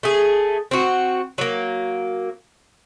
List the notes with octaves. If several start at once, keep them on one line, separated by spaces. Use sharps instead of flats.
A3 G#4
C4 F#4
F#3 A#3